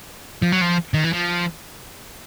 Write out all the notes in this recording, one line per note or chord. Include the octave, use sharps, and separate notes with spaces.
F3
F#3
F3
D#3
E3
F3